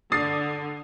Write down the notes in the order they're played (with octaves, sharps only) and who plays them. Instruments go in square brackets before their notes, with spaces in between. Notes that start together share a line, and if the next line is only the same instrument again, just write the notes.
[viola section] D3 [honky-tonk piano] D#6 A6 C7